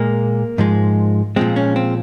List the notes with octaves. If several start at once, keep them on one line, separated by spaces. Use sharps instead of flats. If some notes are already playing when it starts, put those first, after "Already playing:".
Already playing: A#2 G#3 A#3
G#2 F3 G#3
A#2 F3 G#3 C4
C#4
C4